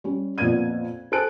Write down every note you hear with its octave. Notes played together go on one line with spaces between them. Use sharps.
G3 C#4
F2 A#2 B3 D5 G#6 D#7
A4 C5 G#5 A5 F#6 D7